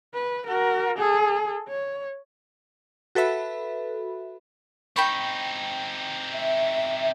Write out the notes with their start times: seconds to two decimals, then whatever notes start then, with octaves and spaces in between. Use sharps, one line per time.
0.14 B4
0.47 F#4 A#4
0.98 G#4 A4
1.68 C#5
3.15 F#4 A4 B4 E5 B5
4.96 C4 D#4 G5 B5 C#6
6.33 E5